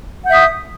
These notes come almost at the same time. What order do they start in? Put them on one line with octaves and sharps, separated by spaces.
F#5 G6 E5 D#6